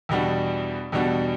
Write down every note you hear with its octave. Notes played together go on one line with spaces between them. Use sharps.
E2 B2 G3 D4 F#4
E2 B2 G3 D4 F#4